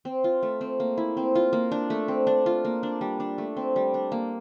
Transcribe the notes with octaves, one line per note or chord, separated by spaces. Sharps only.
C4
F4
A3
C4
A#3
E4
C4
F4
A#3
D4
A3
C4
D4
F4
A#3
D4
G3
D4
A3
C4
G3
D4
A#3